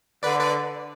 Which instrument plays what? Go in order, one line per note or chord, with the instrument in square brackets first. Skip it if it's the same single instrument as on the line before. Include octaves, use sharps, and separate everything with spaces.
[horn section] D3 [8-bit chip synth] B4 D5
[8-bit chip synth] B4 D5